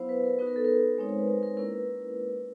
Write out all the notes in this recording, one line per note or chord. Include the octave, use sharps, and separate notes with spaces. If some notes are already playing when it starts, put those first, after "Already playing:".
Already playing: F#3 B3 E4 C5 F5
B4
A#4
B3 D#4 F#4 B4
A#4
A4
A#4
G#3 C4 D#4 C#5
C5
B4
A#4
A#4
A#3 C#4 E4 A#4
B4